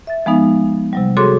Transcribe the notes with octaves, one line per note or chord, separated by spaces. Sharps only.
E5 A6
F3 G#3 B3 D#4
C3 F#3 G3
F#4 G#4 A4 C#5 C6 D6